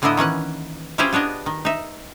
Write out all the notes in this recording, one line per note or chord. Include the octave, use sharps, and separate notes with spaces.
A2 D3 A#3 B3 E4 D#5
D#3 E3 C#4 F#5
C#4 E4 F4 G4 G#4 C5
B3 D4 C#5 D#5
D#3
D#4 E5